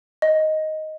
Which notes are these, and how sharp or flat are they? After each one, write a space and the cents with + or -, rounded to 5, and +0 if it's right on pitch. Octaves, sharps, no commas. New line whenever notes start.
D#5 +5